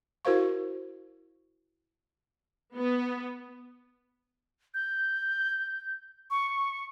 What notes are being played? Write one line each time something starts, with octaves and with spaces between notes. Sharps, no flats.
E4 F#4 A#4 C5 F5 C#6
B3
G6
C#6